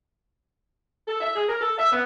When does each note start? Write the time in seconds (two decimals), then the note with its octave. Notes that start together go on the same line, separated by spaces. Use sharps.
1.07 A4
1.20 E5
1.35 G#4
1.48 A#4
1.60 A4
1.77 E5
1.91 B3